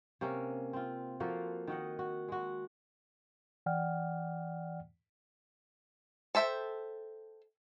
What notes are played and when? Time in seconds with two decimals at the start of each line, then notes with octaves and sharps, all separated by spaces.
0.21 C3 A#3 C#4
0.73 C4 F4
1.20 F3 A#3 F#4 A4
1.68 D#3 F#4 D#5 F#5
1.99 F#4
2.28 G#3 F#4
3.66 E3 D5 F#5 G5 F6
6.35 A4 C5 E5 G5